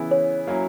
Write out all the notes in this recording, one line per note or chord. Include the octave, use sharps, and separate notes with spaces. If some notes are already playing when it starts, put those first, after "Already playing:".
Already playing: C#3 E3 B3 E4
C#5
F#3 A#3 C#4 E4